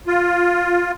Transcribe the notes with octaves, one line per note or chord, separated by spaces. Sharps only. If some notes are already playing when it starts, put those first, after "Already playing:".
F4